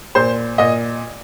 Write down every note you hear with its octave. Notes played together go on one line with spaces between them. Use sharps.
A#2 C5
A#2 D#5